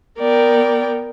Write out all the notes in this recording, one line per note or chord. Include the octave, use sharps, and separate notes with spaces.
B3 A#4 D5 G5